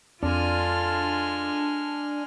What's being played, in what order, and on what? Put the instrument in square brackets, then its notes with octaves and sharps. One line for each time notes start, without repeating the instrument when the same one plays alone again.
[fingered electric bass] F2 C4 [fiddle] G#3 F6 [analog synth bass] D4 [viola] F4 A4